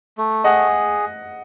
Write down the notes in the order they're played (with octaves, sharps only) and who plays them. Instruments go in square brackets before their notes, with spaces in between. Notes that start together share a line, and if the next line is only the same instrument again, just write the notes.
[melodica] A3
[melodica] G#4 [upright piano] D#5 F#5